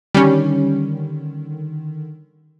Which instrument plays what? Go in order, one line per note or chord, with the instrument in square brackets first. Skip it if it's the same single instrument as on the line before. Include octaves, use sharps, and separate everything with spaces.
[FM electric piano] D3 D#3 [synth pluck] G3 C#4